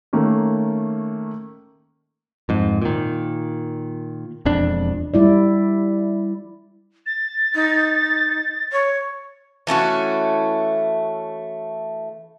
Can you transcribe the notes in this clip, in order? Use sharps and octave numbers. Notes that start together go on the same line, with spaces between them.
D#3 A3 A#3 C#4
F2 G#2
A#2 D#3
E1 F2 D4
G3 E4 D5
A6
D#4
C#5
E3 A3 C#4 F#4